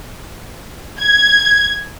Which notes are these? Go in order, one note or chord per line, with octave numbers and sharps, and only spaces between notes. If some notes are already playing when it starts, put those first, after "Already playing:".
G#6